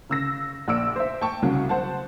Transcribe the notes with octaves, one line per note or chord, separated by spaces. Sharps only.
C#3 E6 A#6
A#1 D5 E6 D7
C5 E5
G5 A5 C#6
C2 C#3 F#3
C5 F#5 A5